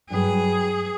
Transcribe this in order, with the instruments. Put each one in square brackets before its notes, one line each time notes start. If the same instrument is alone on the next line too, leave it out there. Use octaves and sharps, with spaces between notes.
[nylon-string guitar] G2 F#3 B4 [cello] G#4